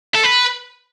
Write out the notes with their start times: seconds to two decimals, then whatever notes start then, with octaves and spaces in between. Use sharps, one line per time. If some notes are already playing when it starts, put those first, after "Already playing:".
0.15 A4
0.24 B4